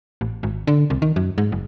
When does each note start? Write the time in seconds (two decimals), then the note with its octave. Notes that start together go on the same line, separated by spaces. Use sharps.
0.21 A1
0.43 G#1
0.67 D3
0.90 C2
1.02 D#3
1.16 F#2
1.38 G#2
1.52 F#1